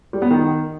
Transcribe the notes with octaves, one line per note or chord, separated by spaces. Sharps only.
G3
B3
D#3